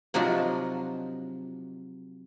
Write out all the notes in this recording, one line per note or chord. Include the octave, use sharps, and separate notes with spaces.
C3 F3 F#3 D4 D#4 F4